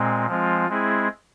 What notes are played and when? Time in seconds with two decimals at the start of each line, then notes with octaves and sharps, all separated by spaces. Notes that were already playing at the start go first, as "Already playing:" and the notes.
Already playing: A#2 G#3 C4
0.27 F3 G#3 C4 F4
0.68 G#3 C4 E4 G#4